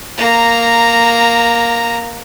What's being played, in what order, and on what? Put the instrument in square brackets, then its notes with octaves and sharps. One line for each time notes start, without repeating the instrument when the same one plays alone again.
[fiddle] A#3 A#5